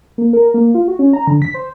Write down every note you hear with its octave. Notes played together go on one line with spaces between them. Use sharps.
A#3
A#4
A#3
F4
F#4
C#4
A#5
D3
B6
C5